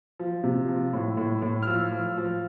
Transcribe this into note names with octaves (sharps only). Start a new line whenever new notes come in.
F3
C3
F3
A2
A2
A2
F6
F3 E6
F3
F3